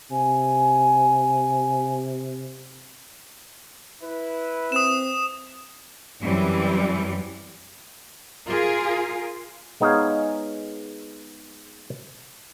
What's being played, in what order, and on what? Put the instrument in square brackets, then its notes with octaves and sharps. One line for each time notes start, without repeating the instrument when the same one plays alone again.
[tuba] C3 [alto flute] G#5
[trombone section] E4 B4
[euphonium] C4 [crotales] D#6 E7
[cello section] F#2 E3 G3 C4
F4 G#4 A#4 F5
[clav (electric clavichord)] G#3 B3 D#4 G#4 C#5 F5